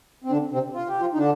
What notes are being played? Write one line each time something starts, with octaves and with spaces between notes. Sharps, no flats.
C4
D3 D4
C3 C4
F4
G4
F3 F4
D#4
D3 D4